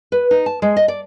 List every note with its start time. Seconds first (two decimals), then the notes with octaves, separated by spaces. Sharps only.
0.12 B4
0.31 D#4
0.46 A5
0.62 G#3
0.76 D#5
0.88 D5